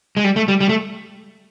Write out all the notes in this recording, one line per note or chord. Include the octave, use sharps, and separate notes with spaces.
G#3
G3
A3
G3
G3
A3